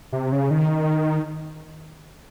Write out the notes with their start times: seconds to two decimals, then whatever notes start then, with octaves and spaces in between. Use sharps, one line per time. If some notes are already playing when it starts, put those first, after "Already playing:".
0.12 C3
0.32 C#3
0.51 D#3